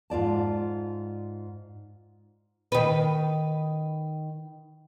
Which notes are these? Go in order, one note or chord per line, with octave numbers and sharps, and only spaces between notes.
G#2 F4 D5 A5
D#3 B4